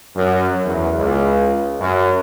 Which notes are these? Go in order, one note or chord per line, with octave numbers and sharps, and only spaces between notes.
F#2
E2
C#2
F#2